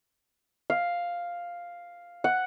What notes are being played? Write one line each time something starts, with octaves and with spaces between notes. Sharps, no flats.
F5
F#5